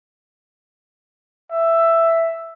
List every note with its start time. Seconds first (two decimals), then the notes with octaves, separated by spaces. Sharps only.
1.51 E5